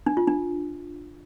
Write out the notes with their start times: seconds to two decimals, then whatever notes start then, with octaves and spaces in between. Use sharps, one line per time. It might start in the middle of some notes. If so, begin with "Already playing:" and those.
0.06 D4
0.17 F4
0.27 D4